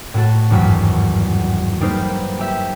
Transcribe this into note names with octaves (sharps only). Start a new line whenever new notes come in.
A2 F#4 A4
G#1 E2 G2 F#3 B6
G3 A#3 D#4 B4 C5
G4 E5